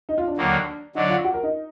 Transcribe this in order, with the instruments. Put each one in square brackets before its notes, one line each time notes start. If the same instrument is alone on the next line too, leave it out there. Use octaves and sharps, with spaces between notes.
[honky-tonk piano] D#4
F4
D4
[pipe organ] D#2 D3 F#3 A#3
[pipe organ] D3 F#3 D4 [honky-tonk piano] D#4
[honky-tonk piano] F4
F#4
A#4
D#4